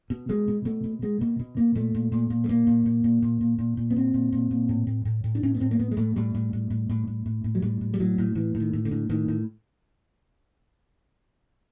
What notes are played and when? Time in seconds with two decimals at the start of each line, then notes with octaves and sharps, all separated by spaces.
0.10 B2
0.29 B2 G#3
0.48 B2
0.65 B2 A3
0.84 B2
1.02 B2 G#3
1.21 B2 A#3
1.39 B2
1.57 B2 A#3
1.75 A#2 A3
1.95 A#2
2.12 A#2
2.30 A#2
2.44 A3
2.49 A#2 A#3
2.67 A#2
2.86 A#2
3.04 A#2
3.22 A#2
3.41 A#2
3.59 A#2
3.77 A#2
3.91 B3
3.96 A#2 C4
4.14 A#2
4.33 A#2
4.51 A#2
4.69 A2
4.87 A2
5.05 A2
5.24 A2
5.35 D4
5.43 A2 C#4
5.55 B3
5.60 A2 C4
5.71 A#3
5.79 A2 B3
5.91 G#3
5.97 A2 A3
6.16 A2 G3
6.35 A2
6.53 A2
6.70 A2
6.89 A2
7.07 A2
7.26 A2
7.44 A2
7.55 F#3
7.62 A2 G3
7.81 A2
7.94 G3
8.00 A2 F#3
8.18 A2
8.35 A2 E3
8.55 A2
8.60 D#3
8.73 A2
8.85 D3
8.91 A2
9.09 A2 D#3
9.28 A2